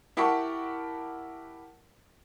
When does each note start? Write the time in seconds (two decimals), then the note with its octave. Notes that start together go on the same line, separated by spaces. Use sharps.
0.17 E4 G4 A#4 F#5 A5 C#6